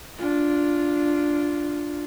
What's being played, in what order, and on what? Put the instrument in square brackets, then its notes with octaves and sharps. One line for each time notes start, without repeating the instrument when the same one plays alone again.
[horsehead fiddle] D4 F4